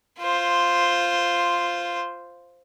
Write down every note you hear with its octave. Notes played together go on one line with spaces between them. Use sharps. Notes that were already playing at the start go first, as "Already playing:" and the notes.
F4 C5